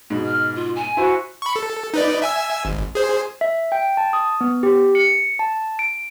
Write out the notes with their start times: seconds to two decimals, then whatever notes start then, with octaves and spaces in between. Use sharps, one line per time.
0.10 G#2 B2
0.26 F6
0.56 F4
0.76 G#5
0.97 E4 F#4 C5
1.42 B5 C#6
1.56 A4
1.94 D#4 B4 D5
2.22 E5 G#5 E6
2.65 G#1
2.95 G#4 C5
3.41 E5
3.72 G5
3.97 A5
4.13 D#6
4.41 B3
4.63 G4
4.95 C#7
5.39 A5
5.79 D7